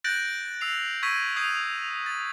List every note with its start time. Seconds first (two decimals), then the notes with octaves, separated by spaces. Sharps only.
0.04 F#6 G6 A6 A#6 D7 F#7
0.61 E6 C7 F7
1.03 C#6 E6 G#6 A#6 B6 D#7
1.36 D#6 G6 G#6 C7 D#7
2.06 A6